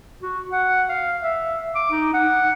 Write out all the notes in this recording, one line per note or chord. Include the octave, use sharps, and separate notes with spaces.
F#4
F#5
F5
E5
D6
D#4
F#5